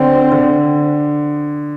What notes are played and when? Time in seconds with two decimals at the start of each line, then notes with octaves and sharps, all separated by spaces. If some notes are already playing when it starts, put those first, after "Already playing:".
Already playing: D3 C4
0.32 D3